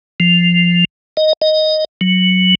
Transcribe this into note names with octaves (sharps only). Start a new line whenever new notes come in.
F3
D#5
D#5
F#3